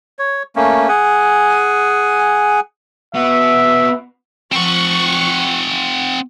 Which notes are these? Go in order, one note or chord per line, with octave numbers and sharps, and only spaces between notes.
C#5
A3 A#3 C#4
G#4 F#5 G#5
B3 F#4 E5
F3 C4 F#5 C#6